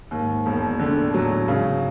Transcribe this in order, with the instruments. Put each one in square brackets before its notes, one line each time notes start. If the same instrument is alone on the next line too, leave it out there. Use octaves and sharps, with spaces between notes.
[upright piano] D#2 [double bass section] G#2
[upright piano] E1
[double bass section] A2 [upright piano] D3
[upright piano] F#3
[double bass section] G#2 [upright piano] C#3